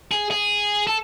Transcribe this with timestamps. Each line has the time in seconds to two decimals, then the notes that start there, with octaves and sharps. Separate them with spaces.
0.12 G#4
0.31 G#4
0.87 A4